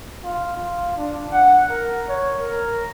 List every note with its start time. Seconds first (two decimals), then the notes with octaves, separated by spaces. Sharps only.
0.24 F4
0.56 F4
0.96 D4
1.32 F#5
1.70 A#4
2.08 C#5
2.41 A#4